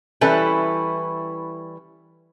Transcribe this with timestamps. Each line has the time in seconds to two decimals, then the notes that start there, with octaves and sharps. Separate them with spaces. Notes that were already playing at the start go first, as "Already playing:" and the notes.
0.21 E3 G3 C#4 E4 A4 B4